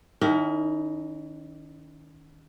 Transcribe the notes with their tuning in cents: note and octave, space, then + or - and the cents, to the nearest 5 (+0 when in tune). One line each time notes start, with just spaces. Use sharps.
D#3 -5 C#4 +35 E4 -20